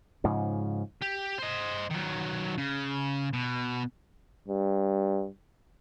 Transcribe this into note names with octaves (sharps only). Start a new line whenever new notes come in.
G#2 C#3 F3
G4
C5 D#5
D#3 F#3
C#3
B2
G2